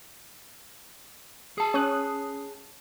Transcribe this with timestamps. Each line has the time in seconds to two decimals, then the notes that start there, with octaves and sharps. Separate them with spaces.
1.58 G#4 A5
1.74 C#4 C#5 D#6 F#6